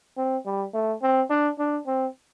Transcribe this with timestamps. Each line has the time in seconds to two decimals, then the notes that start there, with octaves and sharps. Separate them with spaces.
0.18 C4
0.46 G3
0.74 A3
1.02 C4
1.30 D4
1.59 D4
1.87 C4